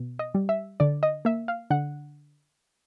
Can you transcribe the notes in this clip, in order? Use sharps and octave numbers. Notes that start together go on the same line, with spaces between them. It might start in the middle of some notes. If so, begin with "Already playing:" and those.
Already playing: B2
D#5
G3
E5
D3 D5
D#5
A#3 E5
F5
D3 F#5